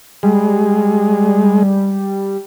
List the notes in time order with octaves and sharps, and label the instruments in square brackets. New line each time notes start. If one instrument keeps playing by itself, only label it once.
[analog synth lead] G3 [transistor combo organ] G#3